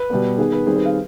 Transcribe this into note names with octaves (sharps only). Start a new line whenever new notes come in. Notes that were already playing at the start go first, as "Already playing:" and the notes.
Already playing: B4
B2 G3 B3
D#3 B3 G#4
B4
D#3 G3 C4 G#4
B4
F5